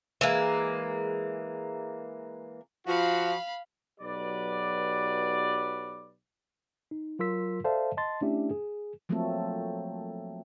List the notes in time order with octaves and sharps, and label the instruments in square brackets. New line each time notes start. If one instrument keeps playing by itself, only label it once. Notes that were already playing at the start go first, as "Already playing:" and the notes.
[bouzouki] E3 G#3 A#3
[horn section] F3 F4 F#4 [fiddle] F5 B5
[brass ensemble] B1 F#3 G4 B4 D5
[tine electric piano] D#4
F#3 F4 A#4 C6 E6 B6
A4 C5 D5 E5 F5 A5
D#5 A5 C6 A6
A3 C#4 D4 E4 G4 E5
G#4
[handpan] F3 F#3 A3 A#3 C4 A4